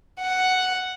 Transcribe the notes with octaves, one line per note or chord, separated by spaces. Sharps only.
F#5